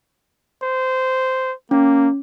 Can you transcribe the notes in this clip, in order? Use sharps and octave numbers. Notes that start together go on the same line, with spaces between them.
C5
A#3 C#4